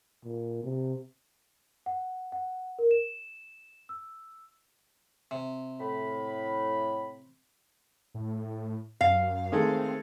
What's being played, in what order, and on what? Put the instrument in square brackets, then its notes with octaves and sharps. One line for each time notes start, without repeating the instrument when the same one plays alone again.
[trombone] A#2
C3
[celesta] F#5
F#5
A#4
E7
E6
[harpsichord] C3
[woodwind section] A2 B5
[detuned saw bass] A2
[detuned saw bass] F#2 [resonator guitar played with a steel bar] F5
[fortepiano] D#3 G#3 A3 [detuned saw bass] C4